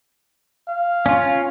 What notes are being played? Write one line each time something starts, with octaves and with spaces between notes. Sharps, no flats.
F5
C#4 F4